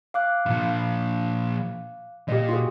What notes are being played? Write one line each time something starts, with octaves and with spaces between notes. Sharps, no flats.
F5 D6 F#6
A#2 F3
A#2 G4 D#5
F4 F#4 G#4